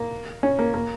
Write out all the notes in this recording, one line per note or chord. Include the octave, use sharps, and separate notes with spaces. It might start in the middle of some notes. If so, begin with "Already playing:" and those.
Already playing: A#3
C#4
A#3
A#3